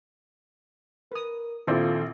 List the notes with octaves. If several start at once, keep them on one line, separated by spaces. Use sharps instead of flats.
A#4 B4 D#6
A#1 D#3 C4 E4 F4 A4 D5